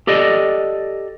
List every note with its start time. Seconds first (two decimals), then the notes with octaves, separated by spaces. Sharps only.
0.07 G4 A4 D5 D#5